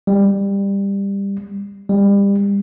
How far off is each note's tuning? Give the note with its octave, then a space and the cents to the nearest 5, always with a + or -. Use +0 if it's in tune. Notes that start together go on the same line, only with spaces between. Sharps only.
G3 +20
G3 +30